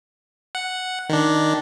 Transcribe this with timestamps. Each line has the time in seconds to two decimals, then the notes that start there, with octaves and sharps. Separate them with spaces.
0.55 F#5
1.09 D#3 D4